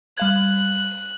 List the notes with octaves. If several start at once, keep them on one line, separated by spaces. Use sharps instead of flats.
G3 F5 F#6 G#6